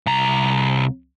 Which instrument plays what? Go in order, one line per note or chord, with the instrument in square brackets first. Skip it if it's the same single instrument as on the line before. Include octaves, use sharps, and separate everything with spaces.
[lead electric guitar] C2 A#5